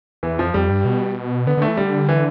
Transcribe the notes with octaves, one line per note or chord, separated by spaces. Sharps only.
E2 E3
F2 F3
F2 G3
G2
B2
D3 B3
D3 A3
E3
D3 G3
E3